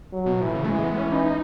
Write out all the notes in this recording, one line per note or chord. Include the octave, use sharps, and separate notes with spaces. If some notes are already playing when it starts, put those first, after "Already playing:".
F#3
B2
A2 E3
C#3
A3
E3 G#3
B3
C#4
D#4